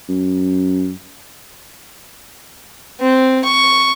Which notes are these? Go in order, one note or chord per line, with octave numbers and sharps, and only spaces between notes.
F#2
C4
C#6